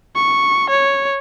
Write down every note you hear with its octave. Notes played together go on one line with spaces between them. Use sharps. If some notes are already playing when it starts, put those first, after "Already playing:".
C#6
C#5